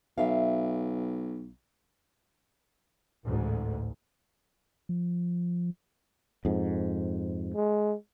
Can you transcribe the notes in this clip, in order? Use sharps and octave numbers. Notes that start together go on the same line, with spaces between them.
B1 E5 F5
A1 D2 G#2
F3
F2 G#2
G#3